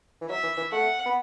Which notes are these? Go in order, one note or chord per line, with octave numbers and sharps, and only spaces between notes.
E3
F#3 E5
E3
E3
A3 F#5
B3